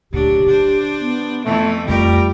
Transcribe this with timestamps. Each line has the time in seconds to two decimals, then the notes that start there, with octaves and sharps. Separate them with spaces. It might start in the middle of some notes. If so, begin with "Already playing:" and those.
0.13 D2 A#2 F#3 D4 G4
0.46 D3 D4 C5
1.00 B3
1.45 F2 E3 A3 E4
1.88 F2 G3 A3 F4 G4 A#4